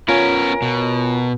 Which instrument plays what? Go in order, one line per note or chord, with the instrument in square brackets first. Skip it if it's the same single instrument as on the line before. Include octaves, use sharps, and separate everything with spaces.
[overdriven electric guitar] B3 C#4 [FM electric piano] F4 C#5 G#5 [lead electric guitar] A#4
[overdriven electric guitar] B2